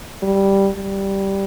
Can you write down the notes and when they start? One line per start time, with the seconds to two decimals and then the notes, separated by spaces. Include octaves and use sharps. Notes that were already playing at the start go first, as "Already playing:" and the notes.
0.22 G3
0.75 G3